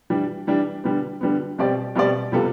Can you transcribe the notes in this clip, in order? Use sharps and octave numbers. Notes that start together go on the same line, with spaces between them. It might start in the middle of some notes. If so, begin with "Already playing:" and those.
E3 G3 D4
E3 G3 D4
D3 G3 B3
D3 G3 B3
B2 G3 C4 G4 D5
B2 G3 C4 G4 D5
C3 G3 B3 F4 A4